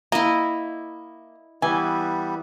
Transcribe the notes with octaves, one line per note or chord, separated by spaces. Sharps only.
A#3 E4 D#5
E3 G3 B3 G#5